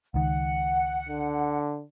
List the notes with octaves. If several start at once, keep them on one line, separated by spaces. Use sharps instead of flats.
C#2 D#3 F#5
D3